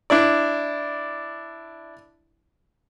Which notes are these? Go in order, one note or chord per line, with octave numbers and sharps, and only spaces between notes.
D4 E4 D5